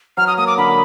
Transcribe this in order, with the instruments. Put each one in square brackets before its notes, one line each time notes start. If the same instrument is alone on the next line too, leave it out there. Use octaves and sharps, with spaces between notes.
[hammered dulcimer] F#3 [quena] F6
[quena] D#6
[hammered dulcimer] A#3 [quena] D#6
[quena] D6
[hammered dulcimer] D3 [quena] B5